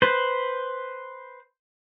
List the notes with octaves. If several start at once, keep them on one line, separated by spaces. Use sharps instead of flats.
B4 C5